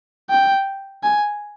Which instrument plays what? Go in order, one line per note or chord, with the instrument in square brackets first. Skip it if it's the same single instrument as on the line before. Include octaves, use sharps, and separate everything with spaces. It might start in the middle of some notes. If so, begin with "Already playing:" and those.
[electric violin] G5
G#5